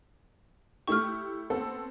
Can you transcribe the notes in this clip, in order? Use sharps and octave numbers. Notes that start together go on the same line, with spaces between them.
A3 E4 G4 C#6 F6
B3 C4 A4